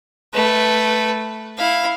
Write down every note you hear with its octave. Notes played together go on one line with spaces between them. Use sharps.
A3 B4
E4 F5